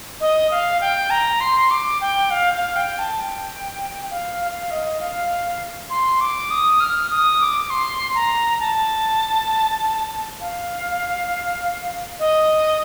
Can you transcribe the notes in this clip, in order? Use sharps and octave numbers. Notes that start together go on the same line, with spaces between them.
D#5
F5
G5
A#5
C6
D6
G5
F5
F5
G5
A5
G5
F5
F5
D#5
F5
C6
D6
D#6
F6
D#6
D6
C6
A#5
A5
F5
D#5